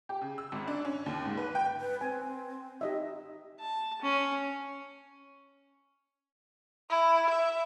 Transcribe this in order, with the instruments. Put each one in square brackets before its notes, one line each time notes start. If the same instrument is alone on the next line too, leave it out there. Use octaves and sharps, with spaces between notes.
[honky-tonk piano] G4
C#3
E6
G#1
D4
C#4
D#2
G#2
B4
G5
[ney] B4
[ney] C4 [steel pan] G#5
[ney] D#4 [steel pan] G4 D#5 E5
[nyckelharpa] A5
C#4
[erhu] E4
E5